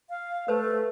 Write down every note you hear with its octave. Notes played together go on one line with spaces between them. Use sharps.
F5
A3 B4 C5 A5